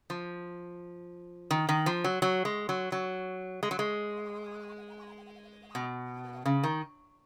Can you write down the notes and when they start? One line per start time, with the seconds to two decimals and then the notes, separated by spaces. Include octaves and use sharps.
0.10 F3
1.51 D#3
1.69 D#3
1.86 F3
2.04 F#3
2.22 F#3
2.45 G#3
2.69 F#3
2.92 F#3
3.63 G#3
3.71 F#3
3.79 G#3
5.75 B2
6.45 C#3
6.63 D#3